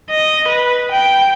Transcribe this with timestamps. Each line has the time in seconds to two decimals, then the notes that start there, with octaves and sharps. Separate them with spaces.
0.10 D#5
0.48 B4
0.91 G5